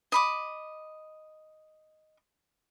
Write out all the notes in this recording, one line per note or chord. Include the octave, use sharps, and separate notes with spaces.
D#5 B5 D6